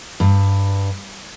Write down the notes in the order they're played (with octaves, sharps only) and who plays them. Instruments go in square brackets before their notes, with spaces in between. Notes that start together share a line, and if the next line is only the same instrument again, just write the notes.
[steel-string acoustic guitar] G2